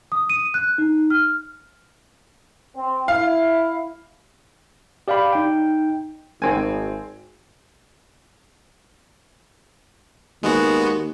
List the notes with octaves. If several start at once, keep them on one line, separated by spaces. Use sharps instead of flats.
D#6
D#7
F#6
D#4
F6
C4
E4 F5
G4 D5 F5 G5 B5
D#4 G5
G#1 C4 G#5
D#2 G#3 B3 F#4